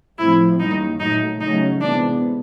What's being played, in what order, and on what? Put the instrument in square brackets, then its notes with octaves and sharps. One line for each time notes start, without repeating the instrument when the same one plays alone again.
[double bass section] A2 F3 A3 C4 [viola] E4
[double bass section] F#2 D#3 G3 A#3 [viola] D#4
[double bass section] A#2 F#3 A3 [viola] D#4
[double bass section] C#3 F#3 A3 C#4 [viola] D#4
[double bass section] C3 E3 G#3 B3 [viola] D4